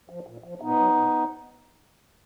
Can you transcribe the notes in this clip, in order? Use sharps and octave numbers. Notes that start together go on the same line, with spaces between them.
F3
A#2
F3
A#2 B3 D#4
F#3
A#2